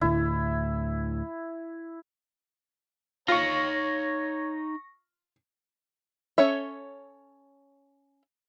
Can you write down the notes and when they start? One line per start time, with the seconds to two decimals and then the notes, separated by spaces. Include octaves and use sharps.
0.01 D2 A2 D3 E4
3.28 D#4 F4 C#5 F5 C#6 A#6
6.38 C#4 A4 C#5 E5